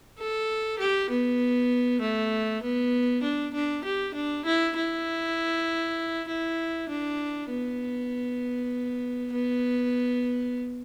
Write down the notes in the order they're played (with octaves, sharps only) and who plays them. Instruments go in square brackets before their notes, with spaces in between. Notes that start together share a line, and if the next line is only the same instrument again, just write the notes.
[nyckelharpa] A4
G4
B3
A3
B3
D4
D4
G4
D4
E4
E4
E4
D4
B3
B3